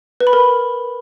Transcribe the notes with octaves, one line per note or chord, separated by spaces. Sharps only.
B4
B5
A#4